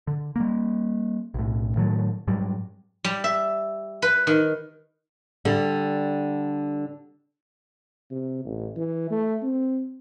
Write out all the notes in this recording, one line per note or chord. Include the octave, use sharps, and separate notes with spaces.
D3
G3 A#3
B1 A2
A2 D#3 F#3 A3
G#2 F#3 G3
G3
E5
B4
D#3
D3 G3
C3
A1
E3
A3
C4